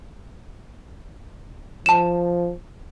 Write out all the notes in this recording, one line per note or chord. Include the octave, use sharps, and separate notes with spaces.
F3 A5 E7